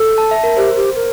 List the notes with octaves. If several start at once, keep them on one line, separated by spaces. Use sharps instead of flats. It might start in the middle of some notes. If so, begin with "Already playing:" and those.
Already playing: A4
A5
E5
A#4
G4 C5
G4 C5
A#4